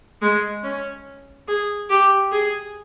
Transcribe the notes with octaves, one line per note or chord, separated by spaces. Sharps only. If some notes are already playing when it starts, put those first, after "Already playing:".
G#3
C#4
G#4
G4
G#4